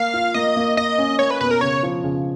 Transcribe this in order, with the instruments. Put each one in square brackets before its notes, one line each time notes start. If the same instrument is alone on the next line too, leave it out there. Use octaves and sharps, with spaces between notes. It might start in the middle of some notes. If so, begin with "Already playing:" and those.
Already playing: [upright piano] A#3 [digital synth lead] F5
[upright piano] F4
[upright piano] A#3 [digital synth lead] D#5
[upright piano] A#3
[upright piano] A#3 [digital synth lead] D#5
[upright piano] C#4
[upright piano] A#3 [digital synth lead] C#5
[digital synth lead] B4
[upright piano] B2 [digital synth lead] B4
[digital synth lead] A#4
[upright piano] C#3 [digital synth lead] C#5
[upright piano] F3
C#3